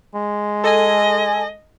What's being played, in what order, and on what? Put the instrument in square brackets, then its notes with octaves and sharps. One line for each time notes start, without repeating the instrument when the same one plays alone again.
[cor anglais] G#3
[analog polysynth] A4 G#5 [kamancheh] D#5